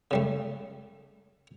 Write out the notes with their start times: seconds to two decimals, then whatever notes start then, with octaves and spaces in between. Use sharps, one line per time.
0.11 C#3 G3 A3